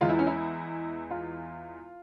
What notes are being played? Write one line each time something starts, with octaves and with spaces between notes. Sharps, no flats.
E2 E3 G#3 F4
E4
C#4
E4
F4